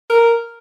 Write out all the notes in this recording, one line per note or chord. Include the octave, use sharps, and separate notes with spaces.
A#4